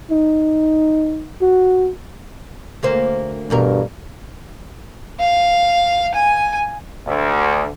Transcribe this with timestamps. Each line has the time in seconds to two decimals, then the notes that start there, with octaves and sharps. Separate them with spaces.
0.10 D#4
1.42 F#4
2.83 D2 A#3 C5
3.50 E2 G2 B2 A#4
5.20 F5
6.15 G#5
7.07 D2